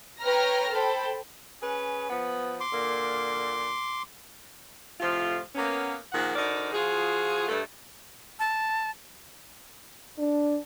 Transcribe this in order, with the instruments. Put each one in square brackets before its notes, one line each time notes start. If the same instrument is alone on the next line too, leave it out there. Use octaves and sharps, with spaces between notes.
[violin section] B4 C#5 G5 A#5 F6 A#6
A4 C5 G5 B5
[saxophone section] C#4 G#4 B4
F3 B3
[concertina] C6 D6
[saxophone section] A#2 D3 A#3
A2 C3 F3 A3 F4
A#3 B3 C#4
A#2 D#3 F3 G#4 F#5
D3 D#4 F#4 A#4 C5 D5
F3 F4 F#4 G#4
G2 A3
[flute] A5
[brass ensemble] D4